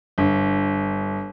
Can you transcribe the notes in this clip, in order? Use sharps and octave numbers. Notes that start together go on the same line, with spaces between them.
G1